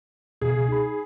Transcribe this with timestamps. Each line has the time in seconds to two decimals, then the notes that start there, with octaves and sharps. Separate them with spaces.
0.42 C#2 B2 G#4
0.69 D#4 B5